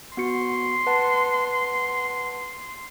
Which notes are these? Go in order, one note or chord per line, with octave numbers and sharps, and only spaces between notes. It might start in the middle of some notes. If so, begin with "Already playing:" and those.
B3 F#4 C6 C#7
B4 F#5 A5